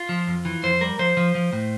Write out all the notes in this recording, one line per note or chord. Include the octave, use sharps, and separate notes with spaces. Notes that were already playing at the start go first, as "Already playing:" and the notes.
Already playing: F4
F3
F2
E3
F2 C5
G3 A#4
F3 C5
F3
F3
A2